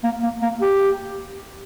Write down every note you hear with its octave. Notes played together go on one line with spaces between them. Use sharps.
A#3
A#3
A#3
G4